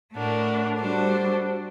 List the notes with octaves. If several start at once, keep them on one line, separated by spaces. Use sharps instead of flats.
A2 A3 D4 F#4 A#4
G3 D4 F#4 A4 C5